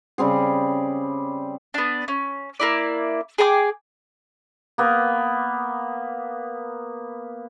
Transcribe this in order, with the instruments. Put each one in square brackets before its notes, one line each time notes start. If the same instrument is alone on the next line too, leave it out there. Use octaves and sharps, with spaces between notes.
[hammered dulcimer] C#3 G3 C4 G#4
[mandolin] B3 D4
C#4
A#3 E4 D5
G#4 G5 A#5 D6
[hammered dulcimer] A#3 B3